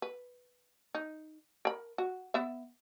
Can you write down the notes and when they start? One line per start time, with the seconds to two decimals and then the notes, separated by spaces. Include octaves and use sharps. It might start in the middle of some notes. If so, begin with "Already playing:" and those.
0.02 B4
0.95 D#4
1.65 A#4 B5
1.98 F#4
2.34 B3 E5